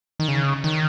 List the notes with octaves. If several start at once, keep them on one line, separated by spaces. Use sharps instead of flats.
D#3
C#3
D#3